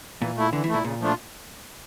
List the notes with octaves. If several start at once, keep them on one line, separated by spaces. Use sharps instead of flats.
A#2 E3
A3 E4
D3 E3
E3
A#2 A3 E4
A#2 C#3
F3 A3 D4 F4